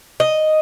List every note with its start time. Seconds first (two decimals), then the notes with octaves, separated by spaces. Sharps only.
0.20 D#5